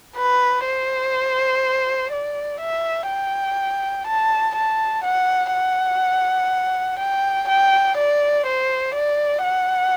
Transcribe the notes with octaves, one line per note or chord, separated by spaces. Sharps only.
B4
C5
D5
E5
G5
A5
A5
F#5
F#5
G5
G5
D5
C5
D5
F#5